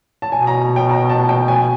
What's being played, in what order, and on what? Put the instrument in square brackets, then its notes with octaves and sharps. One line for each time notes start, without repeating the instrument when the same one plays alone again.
[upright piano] A5
[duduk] B2 [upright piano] G#5
[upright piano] A#5
G5
A#5
A5
G5
G#5